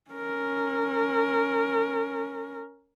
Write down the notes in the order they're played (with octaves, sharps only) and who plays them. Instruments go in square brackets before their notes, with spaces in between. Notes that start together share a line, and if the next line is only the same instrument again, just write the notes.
[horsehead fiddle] C#4 A#4